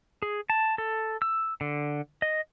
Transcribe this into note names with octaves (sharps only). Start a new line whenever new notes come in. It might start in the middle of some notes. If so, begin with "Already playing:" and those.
G#4
A5
A4
E6
D3
D#5